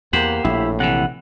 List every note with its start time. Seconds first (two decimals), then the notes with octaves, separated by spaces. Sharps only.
0.13 E2 A#3 G4 C5 F#5
0.45 A#1 A2 E4
0.80 C3 E3 F#5